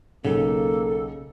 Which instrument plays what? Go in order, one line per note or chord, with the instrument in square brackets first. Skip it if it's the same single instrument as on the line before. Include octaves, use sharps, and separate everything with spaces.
[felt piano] B1 [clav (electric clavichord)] C#3 [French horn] A#3 [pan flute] A4